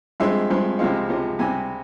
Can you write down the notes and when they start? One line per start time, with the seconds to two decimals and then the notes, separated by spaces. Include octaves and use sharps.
0.20 G2 F3 G#3 C4 E5
0.50 G2 F3 G#3 C4
0.79 C#2 C3 F3 G#3 F5
1.09 C#2 C3 F3 G#3
1.39 C#2 C3 G3 G#5